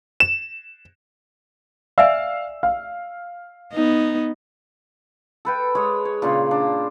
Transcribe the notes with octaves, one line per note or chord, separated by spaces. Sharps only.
E7
D5 E5 F5 G#5 E6
F5
B3 D#4
A4 B4 G5
G#3 G#4 C#5
C#5
A#2 C#3 D4 F4
D4